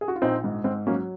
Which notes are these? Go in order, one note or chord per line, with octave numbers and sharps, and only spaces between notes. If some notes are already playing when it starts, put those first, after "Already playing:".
G#4
F#4
F4
A#1 C4 D#4
G#2
G#2 C4
F#3 A#3 C#4